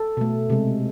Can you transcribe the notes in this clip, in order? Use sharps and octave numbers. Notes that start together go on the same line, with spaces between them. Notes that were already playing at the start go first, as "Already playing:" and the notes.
Already playing: A4
B2 A3
C3 G#3